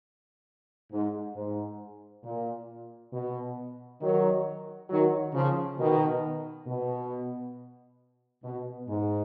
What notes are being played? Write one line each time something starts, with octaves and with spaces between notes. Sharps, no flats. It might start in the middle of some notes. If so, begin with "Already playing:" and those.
G#2
G#2
A#2
B2
D#3 F#3
D#3 F#3
C#3 F3
B2 D#3
B2
B2
G#2